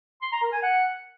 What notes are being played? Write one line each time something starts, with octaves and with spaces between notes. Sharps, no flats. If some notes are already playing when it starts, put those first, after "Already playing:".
C6
A#5
A#4
G#5
F#5